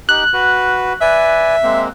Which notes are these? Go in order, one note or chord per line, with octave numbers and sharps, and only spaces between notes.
D#4 G4 F#6
F#4 B4
B4 D5 E5 G#5
G#3 A#3 C4